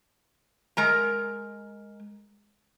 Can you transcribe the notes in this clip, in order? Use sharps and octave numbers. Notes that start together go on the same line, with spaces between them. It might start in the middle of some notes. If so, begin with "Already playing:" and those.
G#3 A#4 A#5